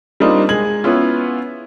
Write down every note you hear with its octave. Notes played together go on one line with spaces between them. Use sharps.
G3 A#3 C4 D4 D#4 F4
G#3 G#6 F#7
B3 C#4 E4 F4